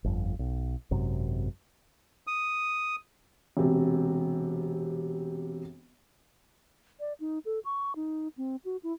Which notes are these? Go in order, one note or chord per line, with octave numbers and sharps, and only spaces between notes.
G1 F2
B1
G#1 F#2 C3
D#6
E1 C3
D5
D#4
A4
C#6
D#4
C4
F#4
E4